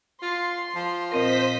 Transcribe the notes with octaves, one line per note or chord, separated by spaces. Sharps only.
F4 C6
F3
A#2 C4 A#4 C5 D#5 B6